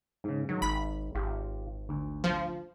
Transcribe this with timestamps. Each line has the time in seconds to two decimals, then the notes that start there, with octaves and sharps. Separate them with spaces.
0.24 G#2 C#3
0.49 G#2 D#3 F#3
0.62 G#1 B5
1.15 G#1 F4 G4
1.89 D2
2.24 F3